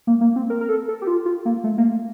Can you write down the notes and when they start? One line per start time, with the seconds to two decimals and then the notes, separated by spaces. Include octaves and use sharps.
0.07 A#3
0.21 A#3
0.36 C4
0.50 A#4
0.61 A#4
0.69 A4
0.88 A4
1.02 G4
1.07 F4
1.26 F4
1.45 A#3
1.64 A3
1.78 A#3